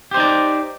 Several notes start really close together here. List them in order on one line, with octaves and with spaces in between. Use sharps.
G4 C5 D#4 D5